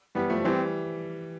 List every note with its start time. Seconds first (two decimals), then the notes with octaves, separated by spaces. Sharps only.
0.15 E3 G3 B3
0.30 F3 A3
0.44 E3 G3 C4